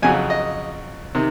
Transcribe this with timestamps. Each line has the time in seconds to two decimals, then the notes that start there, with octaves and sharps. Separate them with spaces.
0.02 F2 C#3 F#3 G#5
0.30 D#5
1.15 C3 D#3